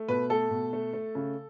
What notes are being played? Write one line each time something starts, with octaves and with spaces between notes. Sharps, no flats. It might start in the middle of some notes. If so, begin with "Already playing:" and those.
Already playing: A3
B2 B4
A3 A4
B2
A3
A3
C#3